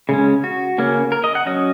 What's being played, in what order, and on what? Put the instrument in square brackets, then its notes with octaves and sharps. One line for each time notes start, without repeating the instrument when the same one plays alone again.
[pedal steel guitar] C#3 G#3 C#4
F#4
C#3 A#3 C#4
A#4
D#5
F#5
F#3 C#4 D#5